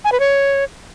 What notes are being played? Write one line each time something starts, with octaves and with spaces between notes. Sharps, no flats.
G#5
B4
C#5